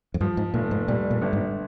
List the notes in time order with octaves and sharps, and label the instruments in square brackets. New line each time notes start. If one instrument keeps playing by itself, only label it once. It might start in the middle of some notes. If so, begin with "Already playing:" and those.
[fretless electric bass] F2
[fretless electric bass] G2 [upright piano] F3
[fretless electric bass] G#2
[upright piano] F1 [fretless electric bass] A#2
[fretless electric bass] G#2
[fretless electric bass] A#2 [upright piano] G3
[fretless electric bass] A#2
[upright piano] G1
[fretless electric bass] G#2